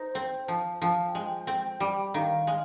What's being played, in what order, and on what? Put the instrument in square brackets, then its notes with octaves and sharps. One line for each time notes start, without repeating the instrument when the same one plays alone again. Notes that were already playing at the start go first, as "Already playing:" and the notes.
Already playing: [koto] D#4 [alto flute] C5
[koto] C4
F3
[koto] F3 [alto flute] G5
[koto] G#3
C4
G3
[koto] D#3 [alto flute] F5
[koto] G#3